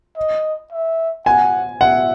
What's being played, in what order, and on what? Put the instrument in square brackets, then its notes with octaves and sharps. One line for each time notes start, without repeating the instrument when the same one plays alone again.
[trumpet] D#5
E5
[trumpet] F#5 [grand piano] G#5
[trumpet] E5 [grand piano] F#5